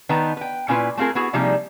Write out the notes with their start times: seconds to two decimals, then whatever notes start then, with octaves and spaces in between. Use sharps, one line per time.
0.09 D#3 B3 D#4 B4 A5 A#5
0.37 B4 G5
0.68 A#2 C#4 E4 F4 B4
0.97 A3 C4 F4 G#4 A#4
1.15 B3 E4 F#4 G#4
1.33 C3 F3 G3 A#3 D#4 G#4